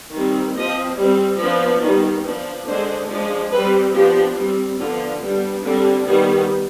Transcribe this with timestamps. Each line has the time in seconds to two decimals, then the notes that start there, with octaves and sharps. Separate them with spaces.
0.14 D#3 G3 C4
0.56 F3 C4 D#5
0.98 G3 C4
1.40 F3 B3 D4
1.83 D#3 G3 B3
2.25 F3 B3 D4
2.67 D3 G#3 D4 C5
3.10 F3 G#3 D4
3.52 G3 C4 B4
3.94 F3 B3 D4 G4
4.37 G3 C4
4.79 D3 F3 B3 D4 F4
5.21 G3 B3 D4
5.63 D3 G3 C4 D4
6.06 D#3 G3 B3